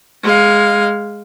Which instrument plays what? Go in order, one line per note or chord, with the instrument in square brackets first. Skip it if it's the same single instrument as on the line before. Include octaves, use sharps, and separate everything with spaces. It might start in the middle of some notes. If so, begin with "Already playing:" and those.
[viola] G#3 F5